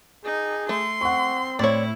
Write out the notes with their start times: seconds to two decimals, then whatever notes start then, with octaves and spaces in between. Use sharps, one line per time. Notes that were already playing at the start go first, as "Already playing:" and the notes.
0.25 D#4 G#4
0.69 A3 C6
1.01 C4 F#5 C#6
1.59 A2 E4 C#5 D5